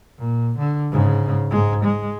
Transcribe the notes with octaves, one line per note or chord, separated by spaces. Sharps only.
A#2
D3
G#2 C#3
G#2 G#3
G#3